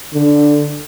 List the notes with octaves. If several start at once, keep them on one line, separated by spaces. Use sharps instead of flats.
D3